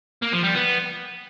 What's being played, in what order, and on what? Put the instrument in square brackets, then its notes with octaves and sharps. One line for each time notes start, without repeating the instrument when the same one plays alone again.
[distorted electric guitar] A#3
F3
G3
B3